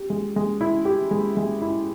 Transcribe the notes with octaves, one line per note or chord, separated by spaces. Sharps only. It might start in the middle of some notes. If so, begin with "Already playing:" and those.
Already playing: G4
G#3
G#3
E4
G4
G#3
G#3
E4